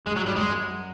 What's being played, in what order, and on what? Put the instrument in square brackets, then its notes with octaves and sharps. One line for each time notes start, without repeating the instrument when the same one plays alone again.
[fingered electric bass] G2 [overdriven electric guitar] G#3
[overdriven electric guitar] F#3
[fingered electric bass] G#2 [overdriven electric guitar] G3
[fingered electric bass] G2 [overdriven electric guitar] G#3
[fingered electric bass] F#2